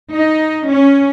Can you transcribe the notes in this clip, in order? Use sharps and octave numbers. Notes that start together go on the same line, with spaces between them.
D#4
C#4